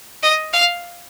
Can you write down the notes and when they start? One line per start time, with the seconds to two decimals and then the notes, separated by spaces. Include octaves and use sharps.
0.23 D#5
0.53 F5